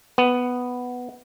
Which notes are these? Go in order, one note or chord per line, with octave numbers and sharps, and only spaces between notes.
B3